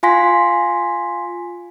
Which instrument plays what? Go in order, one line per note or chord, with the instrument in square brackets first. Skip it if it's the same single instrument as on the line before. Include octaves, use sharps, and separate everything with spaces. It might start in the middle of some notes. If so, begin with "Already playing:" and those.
[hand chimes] F4 F5 G#5 C6 A#6 B6